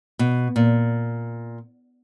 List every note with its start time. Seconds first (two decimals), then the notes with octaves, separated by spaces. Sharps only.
0.19 B2
0.56 A#2